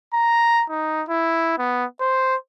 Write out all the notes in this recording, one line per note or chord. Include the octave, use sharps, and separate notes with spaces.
A#5
D#4
E4
B3
C5